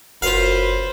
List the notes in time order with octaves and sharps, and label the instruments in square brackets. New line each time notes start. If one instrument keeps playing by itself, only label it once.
[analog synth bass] F#1 [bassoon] F#2 [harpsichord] F4 F5 [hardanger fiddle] B4 C5